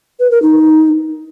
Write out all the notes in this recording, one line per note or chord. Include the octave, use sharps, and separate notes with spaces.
B4
A#4
D#4